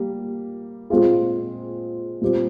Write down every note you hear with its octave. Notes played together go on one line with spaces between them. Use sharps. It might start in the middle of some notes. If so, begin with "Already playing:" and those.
Already playing: G3 A#3
A#2 G#3 C4 F4 G#4
A#2 G3 C4 G4